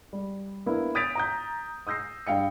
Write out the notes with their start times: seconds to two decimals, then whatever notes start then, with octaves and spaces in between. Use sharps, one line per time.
0.13 G3
0.66 A#3 B3 D4 E4
0.95 D#6 G6 A6 B6 D7 F7
1.15 A#5 D#6 G6
1.87 D#6 E6 G6 A#6 C7
2.27 G2 F5 G5 C#7